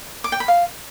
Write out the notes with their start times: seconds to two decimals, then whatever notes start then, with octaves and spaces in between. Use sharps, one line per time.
0.24 D6
0.32 G5
0.40 B5
0.48 F5